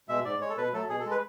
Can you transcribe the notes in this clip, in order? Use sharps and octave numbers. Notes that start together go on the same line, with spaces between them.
B2 G#3 E5
G#2 D5
G#3 C#5
A4
B2 B4
F#3 A3 A4
B2 G#4
A4
G#3
B4